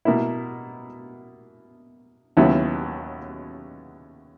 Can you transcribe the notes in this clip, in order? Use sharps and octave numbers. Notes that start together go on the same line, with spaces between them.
B2 A#3 E4
D#2 C#3 F#3 B3 E4